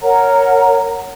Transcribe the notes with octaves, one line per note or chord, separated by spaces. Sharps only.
A#4 C#5 F#5 A#5